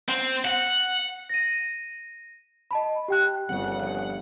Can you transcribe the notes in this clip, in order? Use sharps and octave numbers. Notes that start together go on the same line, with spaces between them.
C4
F#5
A#6 D#7
D#5 A5 B5
G4 G5 F#6
G1 G2 A#2 C#3 F3 G3 C4 F#5